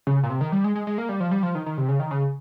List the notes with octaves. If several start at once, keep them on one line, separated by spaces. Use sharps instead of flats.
C#3
A#2
C3
D#3
G3
G#3
G#3
G#3
A#3
G3
F3
G3
F3
D#3
D#3
C3
C#3
D#3
C#3